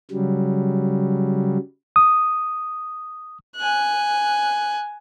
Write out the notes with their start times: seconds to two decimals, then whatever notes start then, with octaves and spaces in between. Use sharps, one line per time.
0.11 C#3 F#3 G3
1.96 D#6
3.57 G#5 F#6